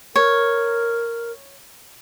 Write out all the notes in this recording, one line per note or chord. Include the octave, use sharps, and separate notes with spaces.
A#4 C#5